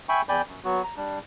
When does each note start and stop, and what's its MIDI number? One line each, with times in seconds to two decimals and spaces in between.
0.09 0.22 76
0.09 0.22 79
0.09 0.22 80
0.09 0.22 83
0.09 0.22 85
0.29 0.42 40
0.29 0.42 74
0.29 0.42 79
0.29 0.42 80
0.29 0.42 83
0.29 0.42 91
0.47 0.59 42
0.64 0.82 54
0.64 0.82 59
0.64 0.82 66
0.84 0.95 82
0.97 1.19 55
0.97 1.19 62